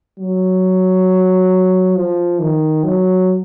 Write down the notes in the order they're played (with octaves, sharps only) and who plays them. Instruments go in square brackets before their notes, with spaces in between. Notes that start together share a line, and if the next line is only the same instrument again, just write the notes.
[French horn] F#3
F3
D#3
F#3